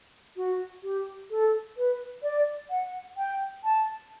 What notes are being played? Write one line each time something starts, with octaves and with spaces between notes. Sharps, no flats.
F#4
G4
A4
B4
D5
F#5
G5
A5